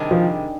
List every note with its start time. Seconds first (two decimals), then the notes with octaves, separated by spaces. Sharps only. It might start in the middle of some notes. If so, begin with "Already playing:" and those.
Already playing: C3 D#3 G3 D4 G#4
0.11 F3